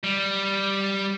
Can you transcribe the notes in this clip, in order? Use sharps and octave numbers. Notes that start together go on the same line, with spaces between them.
G3